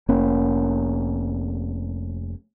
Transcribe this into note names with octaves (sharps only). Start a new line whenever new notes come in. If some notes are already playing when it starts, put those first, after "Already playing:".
F1 A#3 C#4